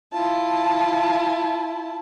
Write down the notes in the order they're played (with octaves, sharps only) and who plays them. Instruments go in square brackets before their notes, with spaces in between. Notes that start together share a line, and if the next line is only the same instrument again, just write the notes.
[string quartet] E4 F4 A5